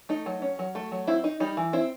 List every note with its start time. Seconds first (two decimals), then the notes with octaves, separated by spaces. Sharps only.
0.09 A3 D#4
0.26 F#3
0.42 C#4
0.59 F#3
0.75 A3
0.91 F#3
1.07 C4 E4
1.24 D#4
1.40 G3 D#4
1.57 E3
1.73 C4 E4